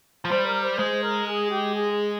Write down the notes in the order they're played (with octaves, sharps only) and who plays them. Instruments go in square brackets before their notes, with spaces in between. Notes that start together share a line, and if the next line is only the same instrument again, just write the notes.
[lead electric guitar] F3
[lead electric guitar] G3 [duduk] C5
[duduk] A#4
C5
[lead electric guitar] G#3 [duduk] C5
[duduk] A#4
G#4
G4
G#4
G#4